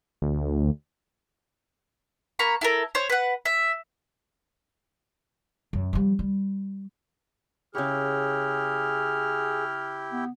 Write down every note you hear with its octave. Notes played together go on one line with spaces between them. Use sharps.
D2
A#3 A#5 B5 C#6
E4 A4 A#4
C5 C#5
B4 F#5
E5
F#2
F3 G3
G3
C#3 E4 G4 G#4 C#5 F6
B3